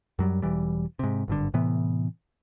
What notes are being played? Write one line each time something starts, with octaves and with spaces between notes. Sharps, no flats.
F#2 F#3 G3
E1 E3 G3
G#2 C3
G#1 G2 D3
A2 C3 E3 B3